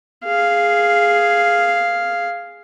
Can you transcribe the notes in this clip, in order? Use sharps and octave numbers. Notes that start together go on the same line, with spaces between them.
G#4 F5